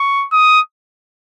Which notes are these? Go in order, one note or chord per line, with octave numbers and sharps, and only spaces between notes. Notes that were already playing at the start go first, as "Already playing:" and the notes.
Already playing: C#6
D#6